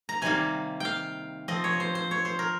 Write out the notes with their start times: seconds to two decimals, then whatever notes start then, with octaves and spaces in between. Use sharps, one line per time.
0.09 A#5
0.22 C3 D#3 G3 A#3 G#5
0.80 F5 G5
1.48 F3 C4 D#5
1.64 C#5
1.80 C5
1.95 C5
2.11 C#5
2.25 C5
2.39 A#4